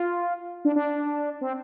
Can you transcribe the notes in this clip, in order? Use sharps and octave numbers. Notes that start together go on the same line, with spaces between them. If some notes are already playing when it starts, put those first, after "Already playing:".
Already playing: F4
D4
D4
C4